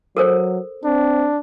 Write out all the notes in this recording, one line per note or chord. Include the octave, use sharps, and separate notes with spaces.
F#3 A4 A#4 C5
C4 D4